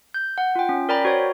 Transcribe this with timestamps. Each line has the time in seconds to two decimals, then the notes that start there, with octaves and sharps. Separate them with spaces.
0.14 G6
0.38 F#5
0.55 F4 G5
0.69 C#4
0.89 A#4 D5 G5 A#5 B5
1.05 F#4 C5 C#5